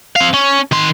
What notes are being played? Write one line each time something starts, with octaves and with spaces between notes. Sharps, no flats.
C4 F5
C#4
D#3 C6